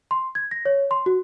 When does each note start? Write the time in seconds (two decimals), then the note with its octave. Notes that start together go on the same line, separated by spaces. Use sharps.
0.11 C6
0.35 G#6
0.51 A#6
0.65 C#5
0.91 C6
1.06 F#4